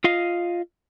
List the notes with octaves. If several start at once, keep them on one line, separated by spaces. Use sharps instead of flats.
F4 D#5 F5